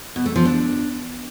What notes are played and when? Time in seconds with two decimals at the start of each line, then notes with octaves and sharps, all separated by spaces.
0.16 B2
0.26 A3
0.36 F3
0.45 D4